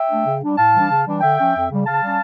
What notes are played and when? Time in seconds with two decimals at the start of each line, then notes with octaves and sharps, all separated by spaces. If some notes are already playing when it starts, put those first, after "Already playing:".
Already playing: E5 G5
0.08 A3 D4
0.24 C#3
0.41 G3 D4
0.57 A2 F5 A5
0.73 E3 G3 D4
0.89 C#3
1.05 E3 G3 D4
1.20 D3 E5 G5
1.37 C#4
1.42 F3
1.53 F2
1.70 C#3 G3
1.85 C#3 F5 A5
2.01 G3 C#4